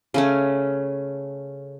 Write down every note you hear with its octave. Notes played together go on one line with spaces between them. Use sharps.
C#3 A3 C#4